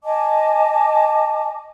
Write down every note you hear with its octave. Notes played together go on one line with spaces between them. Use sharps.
D#5 G#5 A5 D6